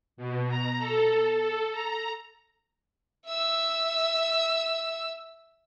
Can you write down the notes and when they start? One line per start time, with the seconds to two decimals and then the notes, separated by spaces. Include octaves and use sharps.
0.17 B2
0.48 A#5
0.78 A4
1.37 A4
1.72 A#5
3.27 E5 E6